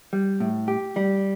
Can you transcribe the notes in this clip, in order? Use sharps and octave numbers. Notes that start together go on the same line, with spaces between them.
G3
A2
G4
G3